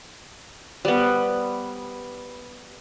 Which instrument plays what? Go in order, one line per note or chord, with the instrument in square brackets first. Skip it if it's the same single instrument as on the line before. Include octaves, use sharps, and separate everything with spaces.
[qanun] G3 B3